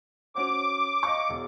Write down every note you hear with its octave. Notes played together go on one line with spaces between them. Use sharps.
C#4 F#4 C5 D6
D#5 F5 C#6
E1